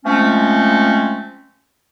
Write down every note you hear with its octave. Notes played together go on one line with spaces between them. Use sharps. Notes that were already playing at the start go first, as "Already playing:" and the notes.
F3 G#3 A3 C4 C#4